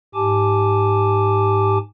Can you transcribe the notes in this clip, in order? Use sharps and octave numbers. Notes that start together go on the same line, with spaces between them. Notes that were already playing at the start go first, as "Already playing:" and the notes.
G#2 G4 G#5 A5 D6